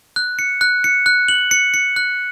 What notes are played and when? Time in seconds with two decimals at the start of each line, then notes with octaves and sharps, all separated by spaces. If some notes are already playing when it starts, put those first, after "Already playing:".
0.16 F#6
0.39 C#7
0.61 F#6
0.84 C#7
1.06 F#6
1.28 F#7
1.51 C#7
1.74 C#7
1.96 F#6